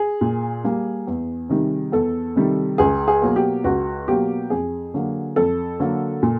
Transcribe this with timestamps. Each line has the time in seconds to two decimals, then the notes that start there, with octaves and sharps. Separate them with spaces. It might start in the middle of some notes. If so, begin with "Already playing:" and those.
Already playing: G#4
0.21 A#2
0.64 G3 A#3
1.07 E2
1.49 C3 D#3 G3
1.92 E2 A4
2.36 C3 D#3 G3
2.78 C#2 G#4
3.08 G#4
3.22 B2 F#3 A#3
3.36 G4
3.64 C#2 F#4
4.08 B2 F#3 A#3 G4
4.50 F2 G#4
4.94 D3 F#3 A#3
5.36 F2 A4
5.80 D3 F#3 A#3
6.23 A#2